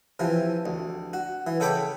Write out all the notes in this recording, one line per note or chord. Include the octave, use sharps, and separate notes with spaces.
C3 E3 F3
D2
F#4
E3
C#3 A4 C#5 G5 B5 D6